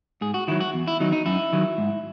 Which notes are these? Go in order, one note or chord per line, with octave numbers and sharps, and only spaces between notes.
G#2 G#4
F#4
D#3 F#3 E4
F#4
E2
E4
D#3 F#3 D#4
D#4
F#2 E4
D#3 F#3
G#2